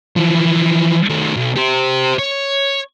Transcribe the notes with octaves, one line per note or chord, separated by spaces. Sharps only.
E3 F3
D#3 A3
B1
G4 C5
C#5